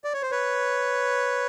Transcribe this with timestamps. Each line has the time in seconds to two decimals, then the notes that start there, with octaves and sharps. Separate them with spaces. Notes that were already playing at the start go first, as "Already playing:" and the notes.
0.04 D5
0.14 C#5
0.22 C5
0.31 B4 C#5